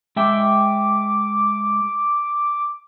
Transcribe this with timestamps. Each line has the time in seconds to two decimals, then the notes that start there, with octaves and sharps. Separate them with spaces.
0.16 G#3 E5 G5 D6